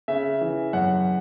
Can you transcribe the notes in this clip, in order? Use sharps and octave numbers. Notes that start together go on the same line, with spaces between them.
C#3 E5
E3
F#2 F#5